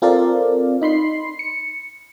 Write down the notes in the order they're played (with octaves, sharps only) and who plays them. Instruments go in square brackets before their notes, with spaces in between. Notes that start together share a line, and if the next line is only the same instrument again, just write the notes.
[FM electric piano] C4 F4 A4 A#4 D5 F5
D#4 B5 C6 C7
C#7